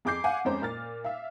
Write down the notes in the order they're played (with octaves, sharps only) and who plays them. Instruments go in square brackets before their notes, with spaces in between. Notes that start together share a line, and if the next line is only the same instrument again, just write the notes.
[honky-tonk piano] F2 G#4 D6 G6 C7
F5 F#5 G#5
F2 G#3 C#4 C5 A#5
A#2 F6 A6
E5 F5